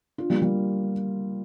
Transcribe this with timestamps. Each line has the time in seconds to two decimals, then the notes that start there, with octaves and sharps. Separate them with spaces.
0.18 D4 F4
0.30 G3 A#3
0.42 G3 A#3